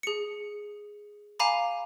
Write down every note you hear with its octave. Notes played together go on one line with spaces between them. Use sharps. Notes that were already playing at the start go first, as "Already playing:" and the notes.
G#4 C#7
F5 G#5 A#5 B5 D6